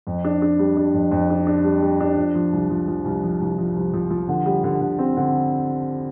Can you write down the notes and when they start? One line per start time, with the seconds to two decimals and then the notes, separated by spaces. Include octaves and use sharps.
0.07 F2
0.24 D4
0.42 D4
0.59 G3
0.77 D4
0.94 F2
1.11 F2
1.30 D4
1.47 D4
1.64 G3
1.82 G3
2.00 D4
2.17 F3
2.35 F3
2.53 C2
2.70 F3
2.88 F3
3.05 C2
3.23 F3
3.41 C2
3.58 F3
3.76 C2
3.93 F3
4.10 F3
4.29 D3
4.46 G3
4.64 D3
4.81 D3
4.99 C4
5.17 D3